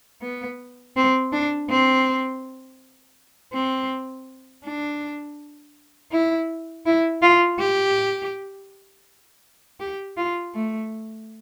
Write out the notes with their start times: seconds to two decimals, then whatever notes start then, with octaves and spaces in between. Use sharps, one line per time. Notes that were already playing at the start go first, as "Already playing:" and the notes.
0.22 B3
0.97 C4
1.33 D4
1.70 C4
3.53 C4
4.64 D4
6.12 E4
6.86 E4
7.22 F4
7.59 G4
9.80 G4
10.17 F4
10.55 A3